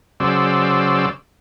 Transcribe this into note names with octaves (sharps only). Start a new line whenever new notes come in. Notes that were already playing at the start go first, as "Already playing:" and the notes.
C#3 F#3 C5 D5 E6